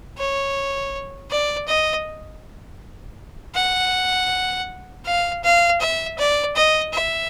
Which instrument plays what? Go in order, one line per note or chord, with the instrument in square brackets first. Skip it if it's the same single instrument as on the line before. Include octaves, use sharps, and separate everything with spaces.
[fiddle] C#5
D5
D#5
F#5
F5
F5
E5
D5
D#5
E5